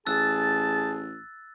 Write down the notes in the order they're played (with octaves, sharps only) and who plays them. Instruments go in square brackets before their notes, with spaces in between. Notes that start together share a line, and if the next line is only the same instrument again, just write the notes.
[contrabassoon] A1 [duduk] G#4 [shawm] A5 [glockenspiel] E6 F#6 A6